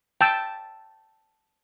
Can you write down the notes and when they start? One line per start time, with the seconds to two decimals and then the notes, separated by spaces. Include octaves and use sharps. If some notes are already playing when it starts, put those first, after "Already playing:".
0.21 G5 A5 E6